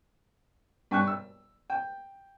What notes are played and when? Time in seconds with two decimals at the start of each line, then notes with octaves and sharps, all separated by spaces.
0.91 G2 G5 C#6 F#6
1.07 E6
1.70 G5